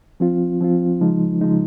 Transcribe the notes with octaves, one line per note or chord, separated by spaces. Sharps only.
F3 C4 F4
F3 C4 F4
C#3 F3 G#3 D#4
C#3 F3 G#3 D#4